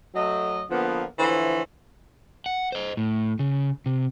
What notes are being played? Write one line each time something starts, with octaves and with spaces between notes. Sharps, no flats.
F#3 A3 D#5
D3 F3 A#3 B3
D3 E3 F3 A3 C5 C#5
F#5
C5 D#5
A2
C#3
C3